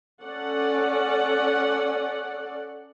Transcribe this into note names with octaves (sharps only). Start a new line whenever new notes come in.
C#4 A4 D5 F#5